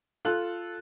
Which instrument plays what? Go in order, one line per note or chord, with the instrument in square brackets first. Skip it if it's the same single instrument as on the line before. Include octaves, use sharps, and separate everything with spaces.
[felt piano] F4 A4 F#6